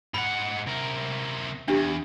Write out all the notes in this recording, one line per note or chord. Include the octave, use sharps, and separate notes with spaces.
G#2 F#5 B5
C3 A#4
E2 D4 G4